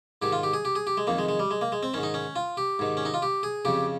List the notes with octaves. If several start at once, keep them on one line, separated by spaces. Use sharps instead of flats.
G#2 D#3 G4
F4
G4
G#4
G4
G#4
G4
G#3
F2 D#3 A#3
G#3
G#3
G3
G#3
A#3
G#3
C4
G#2 D#3 C#4
D#4
C#4
F4
G4
G#2 D#3
C#4
D#4
F4
G4
G#4
F2 C#3 G4